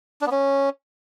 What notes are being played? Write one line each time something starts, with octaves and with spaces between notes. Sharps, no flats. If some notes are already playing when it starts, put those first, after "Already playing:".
D4
B3
C#4